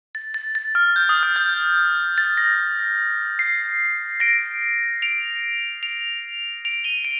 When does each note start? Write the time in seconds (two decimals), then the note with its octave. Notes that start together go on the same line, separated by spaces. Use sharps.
0.15 A6
0.34 A6
0.55 A6
0.75 F6
0.96 G6
1.09 D#6
1.23 F6
1.36 G6
2.18 A6
2.37 A#6
3.39 C7
4.20 A#6 D7
5.02 D7 F7
5.83 D7 F7
6.65 D7 F7
6.84 D#7 G7
7.05 D7